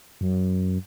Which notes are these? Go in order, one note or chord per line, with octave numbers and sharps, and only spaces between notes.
F#2